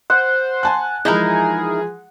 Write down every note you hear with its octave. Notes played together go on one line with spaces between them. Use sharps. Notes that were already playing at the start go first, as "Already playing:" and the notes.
C5 F#5
G#5 A5 F#6
E3 F3 G#3 D#4 E4 G#4 A#4